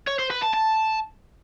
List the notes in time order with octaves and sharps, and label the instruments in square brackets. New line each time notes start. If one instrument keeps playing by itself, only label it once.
[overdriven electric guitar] C#5
C5
B4
A5
A5